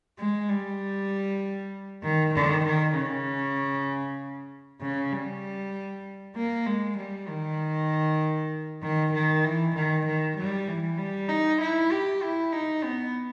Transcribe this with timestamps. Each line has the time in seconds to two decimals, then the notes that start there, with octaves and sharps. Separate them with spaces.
0.19 G#3
0.50 G3
2.03 D#3
2.34 D#3
2.65 D#3
2.97 C#3
4.81 C#3
5.12 G3
6.36 A#3
6.67 G#3
6.98 G3
7.28 D#3
8.83 D#3
9.14 D#3
9.45 E3
9.76 D#3
10.06 D#3
10.37 G3
10.67 E3
10.99 G3
11.29 D#4
11.61 E4
11.92 G4
12.22 E4
12.53 D#4
12.83 B3